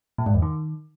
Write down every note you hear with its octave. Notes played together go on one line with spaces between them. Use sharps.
A#2
G#2
E2
D#3